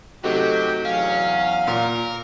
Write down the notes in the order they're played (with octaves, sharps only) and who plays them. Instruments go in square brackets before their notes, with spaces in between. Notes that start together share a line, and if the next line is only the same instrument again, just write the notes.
[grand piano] C3 A3 D#4 [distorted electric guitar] F#3 [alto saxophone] F#4 [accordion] G4 G5
[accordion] E2 F#3 [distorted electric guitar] C#4 [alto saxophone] F5
[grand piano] A#2 [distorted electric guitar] A#4